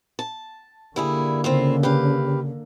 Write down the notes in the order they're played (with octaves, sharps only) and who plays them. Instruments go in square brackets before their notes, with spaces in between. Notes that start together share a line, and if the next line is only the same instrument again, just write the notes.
[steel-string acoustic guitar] A5
[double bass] D3 A#3 [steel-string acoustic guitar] G3 E4 G#4
[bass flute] C#3 [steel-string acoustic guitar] C4 E4 F4
[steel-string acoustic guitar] G4 B4 F5